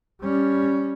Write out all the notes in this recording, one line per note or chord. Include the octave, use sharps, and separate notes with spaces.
G3 C#4